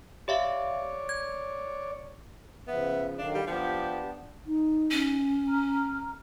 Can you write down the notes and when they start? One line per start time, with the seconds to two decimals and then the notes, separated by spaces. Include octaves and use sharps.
0.28 G4 C#5 D5 E5 F5
1.09 G#6
2.67 C#3 F3 B3 E5
3.18 D3 D#3 F#3 D4 F5
3.34 G3
3.47 F3 B3 D4 G4 A5
4.46 D#4
4.91 C#4
5.49 A#5 F6